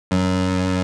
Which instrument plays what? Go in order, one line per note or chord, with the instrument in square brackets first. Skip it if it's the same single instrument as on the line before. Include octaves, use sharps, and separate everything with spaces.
[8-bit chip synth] F#2